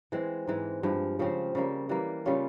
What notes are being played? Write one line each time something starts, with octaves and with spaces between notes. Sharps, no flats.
E3 G#3 C4
G#2 E3 G#3
G2 F3 G#3
C#3 F3 C4
C#3 G3 A#3
E3 G3 A#3
C#3 G3 C#4 F4